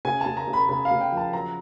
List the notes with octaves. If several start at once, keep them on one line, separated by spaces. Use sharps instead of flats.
C#3 G#5
C#3 A5
A#5
C#3
B5
C#3 B5
F5
C#3
G5
F3 A5
F#3 A#5